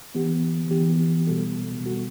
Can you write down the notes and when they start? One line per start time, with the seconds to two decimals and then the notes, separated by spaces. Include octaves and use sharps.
0.15 E3 B3 D#4 G4
0.71 E3 B3 D#4 G4
1.27 B2 G3 B3 F#4 A4
1.83 B2 G3 B3 F#4 A4